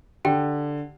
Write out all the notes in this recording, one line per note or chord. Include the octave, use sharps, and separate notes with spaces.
D3 G4 G5